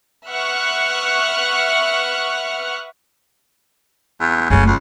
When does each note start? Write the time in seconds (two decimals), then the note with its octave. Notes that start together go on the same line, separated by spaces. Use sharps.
0.29 B4 E5 F#5 C#6 F6 F#6
4.20 E2
4.50 F#1 C#3 A3
4.66 C#2